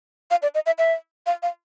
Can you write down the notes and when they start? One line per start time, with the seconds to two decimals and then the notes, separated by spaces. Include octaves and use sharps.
0.31 F5
0.42 D5
0.55 D#5
0.66 E5
0.78 E5
1.27 F5
1.43 F5